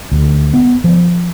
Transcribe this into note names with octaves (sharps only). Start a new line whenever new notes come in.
D2
B3
F3